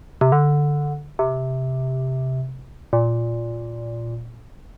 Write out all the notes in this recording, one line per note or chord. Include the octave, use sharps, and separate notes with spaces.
C3
D3
C3
A#2